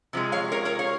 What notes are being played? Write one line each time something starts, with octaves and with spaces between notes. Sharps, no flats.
C3 F3 G#3
C#5 F5
A#4 C#5
A#4 C#5
C#5 F5